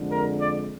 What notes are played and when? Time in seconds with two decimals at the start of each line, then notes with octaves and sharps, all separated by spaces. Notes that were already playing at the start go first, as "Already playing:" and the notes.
Already playing: F2 D3 G#3
0.11 A#4
0.41 D5